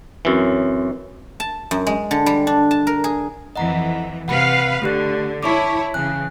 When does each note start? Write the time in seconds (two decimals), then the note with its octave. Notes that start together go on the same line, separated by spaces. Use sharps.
0.25 F#2 E3 C4 C#5
1.40 A5
1.71 F#2
1.87 G#3
2.11 D3
2.26 G3
2.47 D4
2.71 A5
2.87 A#4
3.04 G#4
3.56 F2 E3 D#5 F#5 A#5
4.28 C3 B4 F5 F#5 B5 C#7
4.82 D3 A3 G4 F#6
5.43 E4 C#5 A5 C#6 D6
5.94 C#3 E3 G#5 F#6